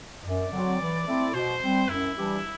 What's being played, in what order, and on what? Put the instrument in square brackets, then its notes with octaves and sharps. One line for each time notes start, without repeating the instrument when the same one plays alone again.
[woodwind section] F#2 [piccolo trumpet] D5
[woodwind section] D3 F#3 C4 F#4
E3
A3 C4 E4 A4
[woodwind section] B2 [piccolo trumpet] C5
[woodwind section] G3 C4
[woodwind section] F#2 [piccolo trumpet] E4
[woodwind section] E3 G3 D4 G4